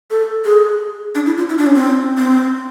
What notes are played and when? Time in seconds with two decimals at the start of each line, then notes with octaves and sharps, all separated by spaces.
0.11 A4
0.45 G#4
1.15 D4
1.26 E4
1.38 F4
1.49 E4
1.58 D4
1.66 C#4
1.75 C4
2.18 C4